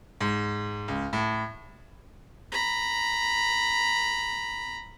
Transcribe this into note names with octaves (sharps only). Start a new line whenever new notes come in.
G#2
C#2
A2
A#5 B5